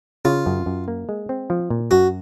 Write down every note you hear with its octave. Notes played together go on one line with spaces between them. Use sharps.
C#3 F4
F#2
F#2
A#3
G#3
C4
F3
A#2
F#2 F#4